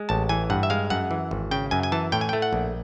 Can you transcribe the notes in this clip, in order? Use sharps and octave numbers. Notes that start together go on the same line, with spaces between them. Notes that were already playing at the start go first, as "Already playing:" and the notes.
Already playing: G#3
A1 A5
E3 G#5
G2 F#5
E5
G#3 F5
F#2 F#5
E3
G#1
C#3 G5
F#2 G#5
G#5
E3 A5
A2 G5
G#5
A3 G5
F#5
A#1